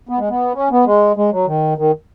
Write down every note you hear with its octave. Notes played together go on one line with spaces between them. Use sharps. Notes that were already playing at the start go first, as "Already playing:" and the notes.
B3
G#3
B3
C#4
B3
G#3
G#3
F#3
D#3
D#3